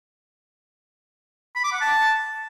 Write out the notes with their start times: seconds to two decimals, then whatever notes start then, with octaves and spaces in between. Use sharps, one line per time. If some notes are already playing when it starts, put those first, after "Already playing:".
1.55 B5
1.64 D6
1.72 F#5
1.81 A5